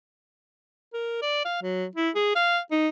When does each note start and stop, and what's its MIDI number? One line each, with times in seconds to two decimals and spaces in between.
0.93 1.21 70
1.22 1.44 74
1.45 1.59 77
1.63 1.86 54
1.95 2.10 64
2.15 2.35 68
2.36 2.59 77
2.71 2.89 63